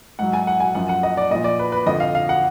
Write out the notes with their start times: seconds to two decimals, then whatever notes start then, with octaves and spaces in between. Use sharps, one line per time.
0.19 G#2 F#3 F#5
0.33 G#5
0.47 F#5
0.60 G#5
0.75 F#2 F3 F#5
0.89 F#5
1.03 D#5
1.17 D5
1.31 A#2 F3 D#5
1.44 D5
1.59 B4
1.72 B4
1.86 F2 D3 F3 D#5
2.00 F5
2.15 F5
2.29 F#5